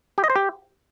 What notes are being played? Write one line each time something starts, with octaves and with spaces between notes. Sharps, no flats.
G4
D#5
C5
G4